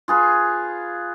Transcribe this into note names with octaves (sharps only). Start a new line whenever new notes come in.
F4 G#4 B4